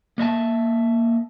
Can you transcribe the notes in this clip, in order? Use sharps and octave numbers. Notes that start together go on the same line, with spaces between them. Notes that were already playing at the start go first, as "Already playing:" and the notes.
A#3 D#5 E5 A5